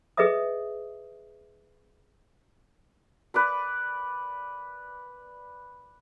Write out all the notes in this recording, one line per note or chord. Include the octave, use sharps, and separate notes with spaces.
G#4 B4 D#5 E5 D#6
B4 D5 B5